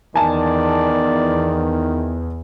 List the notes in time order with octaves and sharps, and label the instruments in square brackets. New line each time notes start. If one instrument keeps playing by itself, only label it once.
[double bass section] E2 [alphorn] D#3 [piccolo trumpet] D5 [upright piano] G#5 A5